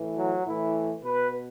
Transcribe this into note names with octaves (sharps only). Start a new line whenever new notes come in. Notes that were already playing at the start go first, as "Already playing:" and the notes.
Already playing: A2 E3
F#3
A2 E3 E4
B2 B4